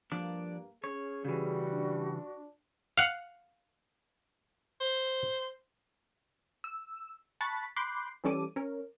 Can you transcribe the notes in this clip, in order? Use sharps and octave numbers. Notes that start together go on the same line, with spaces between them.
G2 F3 G3 A#3 D4 D5
C#4 G#4 C#5
C#3 E3 G3 F#4
D4
F5 F#5
C5
E6
A5 B5 C#6 F#6 A6 B6
B5 C6 D6 F#6 G6 C7
E3 G3 C#4 A4 D6 D#7
C#4 A#4